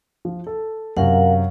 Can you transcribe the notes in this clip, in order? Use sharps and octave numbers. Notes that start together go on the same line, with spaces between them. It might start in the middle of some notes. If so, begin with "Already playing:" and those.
F3
A4
F#2 C3 A#4 F5 F#5